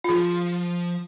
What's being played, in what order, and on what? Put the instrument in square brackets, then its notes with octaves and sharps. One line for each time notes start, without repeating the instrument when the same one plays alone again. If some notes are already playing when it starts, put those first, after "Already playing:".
[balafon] F4
[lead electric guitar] F3 [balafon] G#4